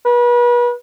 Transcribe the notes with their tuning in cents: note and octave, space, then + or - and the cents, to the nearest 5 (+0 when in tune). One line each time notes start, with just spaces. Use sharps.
B4 -35